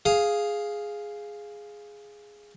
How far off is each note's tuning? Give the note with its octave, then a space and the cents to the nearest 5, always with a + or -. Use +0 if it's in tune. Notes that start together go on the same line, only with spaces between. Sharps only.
G#4 +0 F5 +0